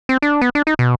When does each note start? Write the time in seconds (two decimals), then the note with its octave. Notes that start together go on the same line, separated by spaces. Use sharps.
0.09 C4
0.22 D4
0.41 B3
0.55 D4
0.67 D#4
0.79 B2